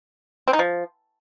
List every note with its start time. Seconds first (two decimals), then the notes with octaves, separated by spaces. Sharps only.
0.48 C4
0.53 D#4
0.59 F3